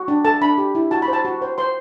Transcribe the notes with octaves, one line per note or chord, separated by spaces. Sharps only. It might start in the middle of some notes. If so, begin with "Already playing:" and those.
Already playing: F#4
D4
A4 A5
D4 B5
G4
E4
F#4 A5
B5
C5
A5
F#4
C5
C5 C6